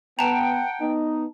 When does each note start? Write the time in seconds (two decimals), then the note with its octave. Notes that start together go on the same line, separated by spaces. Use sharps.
0.19 B3 F#5 G5 A5 A#5
0.81 B3 D#4